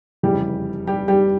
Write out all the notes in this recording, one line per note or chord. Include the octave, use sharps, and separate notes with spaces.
F1 E2 C#3 E3 G3 G4
G3 G4
G3 G4